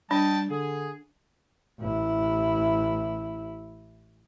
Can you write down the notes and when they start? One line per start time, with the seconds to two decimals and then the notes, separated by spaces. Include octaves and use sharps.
0.11 G3 D4 D#5 G5 A5
0.50 D3 G#4
1.80 A1 E4